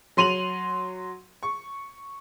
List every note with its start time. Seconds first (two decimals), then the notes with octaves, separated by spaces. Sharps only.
0.17 F#3 C6 D#7 F7 F#7
1.43 C#6